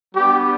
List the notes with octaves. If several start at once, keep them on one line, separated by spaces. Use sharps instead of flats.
G3 B3 D4 G4